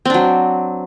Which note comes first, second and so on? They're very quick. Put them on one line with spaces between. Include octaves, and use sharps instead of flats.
C4 D4 F#3